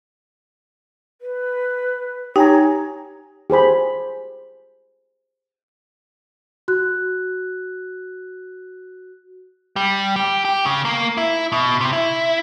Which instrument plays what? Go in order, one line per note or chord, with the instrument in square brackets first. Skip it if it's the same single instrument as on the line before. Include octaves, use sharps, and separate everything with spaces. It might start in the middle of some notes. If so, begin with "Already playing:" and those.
[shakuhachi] B4
[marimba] D#4 [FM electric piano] G4 G#5 A#5 [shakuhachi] C#5
[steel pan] G4 G#4 C5 B5
[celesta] F#4 F#6
[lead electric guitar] G3
G4
G4
C#3
A#3
E4
B2
C3
E4